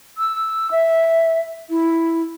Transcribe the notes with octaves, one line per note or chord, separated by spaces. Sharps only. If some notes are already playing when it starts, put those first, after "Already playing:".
E6
E5
E4